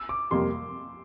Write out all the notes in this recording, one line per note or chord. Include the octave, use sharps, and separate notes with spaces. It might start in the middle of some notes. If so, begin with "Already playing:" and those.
Already playing: E6
D6
F2 C3 G3 A#3 C6